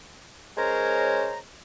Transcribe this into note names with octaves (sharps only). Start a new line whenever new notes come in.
G#3 C#4 A#4 C5 C#5 A#5